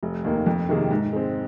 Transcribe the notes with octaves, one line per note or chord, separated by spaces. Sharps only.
F1
D#2 D#3 A#3
F2
C3 D#3 A#3 G#4
G#2
G#3 C4